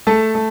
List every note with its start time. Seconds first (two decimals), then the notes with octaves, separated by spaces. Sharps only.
0.07 A3 A4 A5
0.35 A3